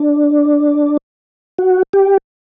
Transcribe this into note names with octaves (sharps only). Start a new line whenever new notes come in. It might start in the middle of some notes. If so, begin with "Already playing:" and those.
Already playing: D4
F#4
G4